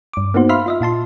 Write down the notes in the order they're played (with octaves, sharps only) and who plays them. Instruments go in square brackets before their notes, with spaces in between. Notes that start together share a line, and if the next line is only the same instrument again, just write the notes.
[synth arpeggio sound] G2 D6
A#3 B3 D#4 F#4 C5
E5 F5 B5 C6 F6
F4 D#5 E5
A#2 F4 A5 C6